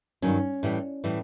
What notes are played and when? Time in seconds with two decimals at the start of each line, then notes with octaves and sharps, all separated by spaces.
0.22 G2 D#3 F#3 C#4
0.63 A2 E3 G3
1.04 A2 E3 G3